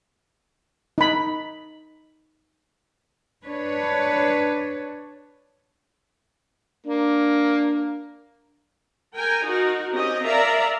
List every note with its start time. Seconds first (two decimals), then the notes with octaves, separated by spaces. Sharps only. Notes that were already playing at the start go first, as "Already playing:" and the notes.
0.98 D#4 B5
3.46 D4 B4 C#5
6.86 A#3 D4
9.14 A#4 G5 G#5
9.46 D#4 F#4 A#4
9.93 C4 C#4 G4 D#5
10.23 A#4 D5 E5 F5 A#5